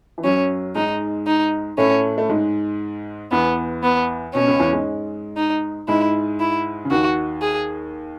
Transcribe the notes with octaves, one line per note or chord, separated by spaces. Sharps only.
E3
F#2 F#3 C#4
G#2 G#3 D#4
D#4
A2 A3 C#4
A3
G#2 G#3
E2 E3 B3
B3
B2 C#4
C#2 C#3
E2 E3
G#2 G#3
D#4
G#2 G#3 E4
E4
C#3
D#2 D#3 F#4
G#4